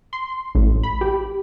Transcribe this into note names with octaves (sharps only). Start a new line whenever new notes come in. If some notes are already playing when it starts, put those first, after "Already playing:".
C6
A1
B5
G4